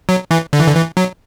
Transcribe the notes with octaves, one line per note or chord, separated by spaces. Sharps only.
F#3
E3
D3
E3
D3
E3
F#3